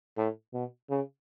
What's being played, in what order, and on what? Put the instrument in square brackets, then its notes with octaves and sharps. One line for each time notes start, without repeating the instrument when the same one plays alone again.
[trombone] A2
B2
C#3